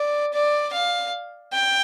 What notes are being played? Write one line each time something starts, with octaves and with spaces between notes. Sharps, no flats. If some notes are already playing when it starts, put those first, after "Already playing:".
Already playing: D5
D5
F5
G5